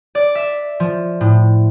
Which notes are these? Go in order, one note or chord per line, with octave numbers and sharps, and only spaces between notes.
D5
E5
F3
A2